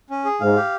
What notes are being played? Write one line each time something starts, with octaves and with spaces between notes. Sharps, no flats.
C#4
G#4
G#2 F5
G4